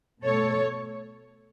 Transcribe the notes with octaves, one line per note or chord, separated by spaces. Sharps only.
B2 A3 A4 C#5